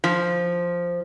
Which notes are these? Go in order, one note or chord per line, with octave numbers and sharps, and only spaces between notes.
F3